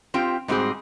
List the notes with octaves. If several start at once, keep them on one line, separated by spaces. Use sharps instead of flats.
C4 F4 G4 G5
G#2 G3 C4 F#4 G#4